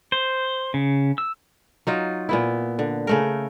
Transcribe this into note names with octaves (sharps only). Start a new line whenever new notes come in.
C5
C#3
E6
F#3 D#4 F4
A#2 B3 E4
D3
C#3 A3 A#4